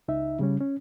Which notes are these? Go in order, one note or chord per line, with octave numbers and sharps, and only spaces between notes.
C#2 D#4 E5
C#3 G3 C#4
C#4